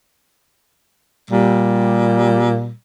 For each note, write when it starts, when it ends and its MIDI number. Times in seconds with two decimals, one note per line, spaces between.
1.31 2.71 46
1.31 2.71 55